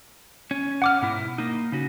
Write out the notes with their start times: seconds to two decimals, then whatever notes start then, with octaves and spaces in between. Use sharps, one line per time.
0.51 C#4
0.82 F#5 D6 F6
1.02 G#2 B2 E4
1.38 A#3 D#4
1.72 C#3 C#4 F#4